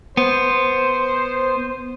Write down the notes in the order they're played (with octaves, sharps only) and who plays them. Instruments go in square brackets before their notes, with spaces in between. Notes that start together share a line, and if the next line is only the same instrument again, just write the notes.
[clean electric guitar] B3 [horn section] C5